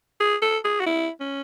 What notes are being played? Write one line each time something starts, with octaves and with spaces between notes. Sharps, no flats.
G#4
A4
G#4
F#4
E4
C#4